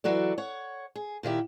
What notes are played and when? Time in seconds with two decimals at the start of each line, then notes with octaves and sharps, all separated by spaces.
0.04 E3 F#3 F#4 A4 D5
0.38 C#5 F#5
0.96 G#4
1.23 A#2 D#3 E4 G4